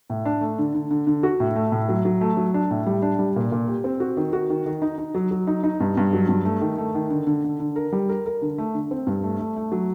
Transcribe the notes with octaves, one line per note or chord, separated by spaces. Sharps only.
A2
D4
A3
D3
D3
D3
D3
F#4
A2
A3
A2
F#3
F#3
A3
F#3
D4
A2
G3
D4
G3
A#2
A#2
G4
C4
F#4
D#3
F#4
D#3
D#3
D#4
D#4
F#3
F#3
D#4
D#4
G2
G2
F#3
G2
A3
D#3
A3
D#3
D3
D3
D3
D3
A#4
G3
A#4
A#4
D3
A3
D3
C4
G2
A3
A3
A3
F#3